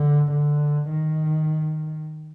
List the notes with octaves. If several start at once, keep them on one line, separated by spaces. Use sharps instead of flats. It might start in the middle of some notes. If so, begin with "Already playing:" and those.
Already playing: D3
D3
D#3